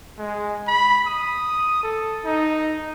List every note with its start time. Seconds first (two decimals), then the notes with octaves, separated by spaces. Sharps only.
0.19 G#3
0.67 B5
1.07 D#6
1.83 A4
2.25 D#4